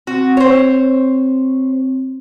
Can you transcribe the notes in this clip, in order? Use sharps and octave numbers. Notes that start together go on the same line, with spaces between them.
C4 F#4
C5 C#5